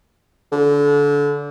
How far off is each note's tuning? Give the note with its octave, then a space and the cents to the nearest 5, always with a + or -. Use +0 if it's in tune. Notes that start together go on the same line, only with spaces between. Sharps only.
D3 -30